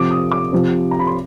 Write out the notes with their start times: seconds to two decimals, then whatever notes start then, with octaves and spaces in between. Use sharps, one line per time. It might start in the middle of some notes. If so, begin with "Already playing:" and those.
Already playing: C3 F3 D6
0.11 D#6
0.32 D6
0.53 C3 F3
0.91 A#5
0.99 B5
1.07 C6